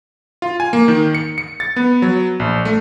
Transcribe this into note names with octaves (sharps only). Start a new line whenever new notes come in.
F4
G#5
A#3
D#3
C#7
C#7
A6
B3
F#3
A#1
A3